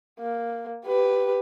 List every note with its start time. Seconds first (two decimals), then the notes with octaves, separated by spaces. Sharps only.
0.20 A#3
0.86 G4 B4